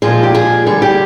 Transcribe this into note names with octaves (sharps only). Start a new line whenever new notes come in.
A#2 F3 G#3 G#4
G4
G#4
D3 G3 G#4
G4